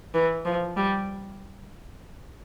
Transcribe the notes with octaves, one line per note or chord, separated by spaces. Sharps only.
E3
F3
G3